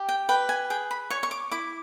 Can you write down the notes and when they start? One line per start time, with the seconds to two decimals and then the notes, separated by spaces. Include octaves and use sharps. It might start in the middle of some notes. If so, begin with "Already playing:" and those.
Already playing: G4
0.09 G5
0.29 B4 G5
0.49 G#5
0.70 G#4 G5
0.91 B5
1.10 C#5 C#6
1.23 C#6
1.31 D6
1.51 E4 D6